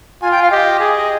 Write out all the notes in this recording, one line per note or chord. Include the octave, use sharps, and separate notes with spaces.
F4 G#5
G5
F5
G4 D#5
G#4